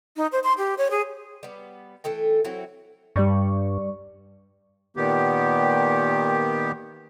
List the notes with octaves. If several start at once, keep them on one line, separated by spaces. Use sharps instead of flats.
D#4
C5
C6
G4
C#5
G#4
G3 B3
E3 A3 A4 G5
F#3 C4 E4 F#4
G2 G3 D5 C#6
A#2 D#3 B3 G4